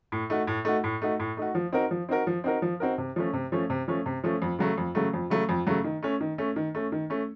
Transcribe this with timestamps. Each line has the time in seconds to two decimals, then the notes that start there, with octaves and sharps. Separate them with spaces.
0.12 A2
0.30 A3 D#4 F#4
0.47 A2
0.65 A3 D#4 F#4
0.84 A2
1.02 A3 D#4 F#4
1.20 A2
1.37 A3 D#4 F#4
1.55 F3
1.72 C4 D#4 F#4 A#4
1.91 F3
2.09 C4 D#4 F#4 A#4
2.27 F3
2.44 C4 D#4 F#4 A#4
2.62 F3
2.80 C4 D#4 F#4 A#4
2.98 C3
3.16 F3 A3 C#4
3.33 C3
3.52 F3 A3 C#4
3.70 C3
3.88 F3 A3 C#4
4.06 C3
4.24 F3 A3 C#4
4.42 F2
4.59 C#3 F#3 A3
4.78 F2
4.95 C#3 F#3 A3
5.13 F2
5.30 C#3 F#3 A3
5.49 F2
5.67 C#3 F#3 A3
5.84 D#3
6.03 A3 C#4
6.20 D#3
6.38 A3 C#4
6.56 D#3
6.75 A3 C#4
6.92 D#3
7.10 A3 C#4